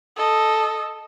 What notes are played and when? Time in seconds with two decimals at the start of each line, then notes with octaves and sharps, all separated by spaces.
0.17 A4 D#5